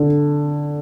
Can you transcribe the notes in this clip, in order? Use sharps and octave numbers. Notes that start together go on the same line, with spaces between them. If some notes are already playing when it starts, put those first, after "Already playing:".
Already playing: D3